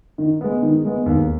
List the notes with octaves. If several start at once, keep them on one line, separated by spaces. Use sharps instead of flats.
D#3
G#3 B3
D#3
G#3 B3
D#2